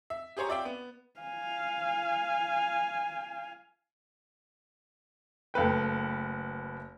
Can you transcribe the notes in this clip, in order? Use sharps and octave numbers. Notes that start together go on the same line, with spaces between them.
E5
G4 G#4 C5 C#5 A#5
F4 D5 E5 G5
B3
F5 G#5
F#1 A3 B4 G5